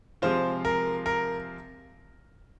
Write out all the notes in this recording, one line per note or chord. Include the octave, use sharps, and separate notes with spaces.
C3 F3 G#3 F4 C5
A#4
A#4